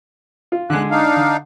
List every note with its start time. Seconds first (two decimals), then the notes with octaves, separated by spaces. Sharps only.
0.52 F4
0.70 D2 D3 G#3 F#6
0.91 D4 D#4 F5
1.16 D3